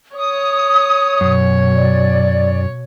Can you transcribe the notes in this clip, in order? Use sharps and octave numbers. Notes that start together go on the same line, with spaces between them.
C#5 D#6
F#2 B2
D5